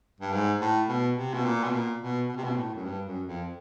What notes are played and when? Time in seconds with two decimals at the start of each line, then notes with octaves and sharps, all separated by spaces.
0.20 G2
0.33 G#2
0.61 A2
0.89 B2
1.16 C3
1.34 B2
1.45 A#2
1.64 B2
1.72 A#2
2.01 B2
2.29 B2
2.37 C3
2.44 B2
2.56 A2
2.75 F#2
2.84 G2
3.06 F#2
3.27 F2